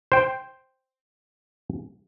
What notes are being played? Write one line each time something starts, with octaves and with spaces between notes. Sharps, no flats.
C5 G5